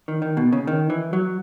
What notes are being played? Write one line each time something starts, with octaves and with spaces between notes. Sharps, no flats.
D#3
D#3
B2
C#3
D#3
E3
F#3